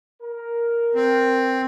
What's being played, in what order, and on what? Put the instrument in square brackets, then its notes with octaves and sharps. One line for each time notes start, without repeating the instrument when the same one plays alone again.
[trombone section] A#4
[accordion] C4